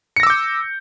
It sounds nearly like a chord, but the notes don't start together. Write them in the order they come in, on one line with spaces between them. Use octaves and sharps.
C#7 A#6 E6 D6 G6